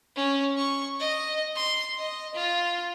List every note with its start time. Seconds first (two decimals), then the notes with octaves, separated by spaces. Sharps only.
0.16 C#4
0.57 C#6
1.00 D#5
1.56 C6
1.99 D#5
2.35 F4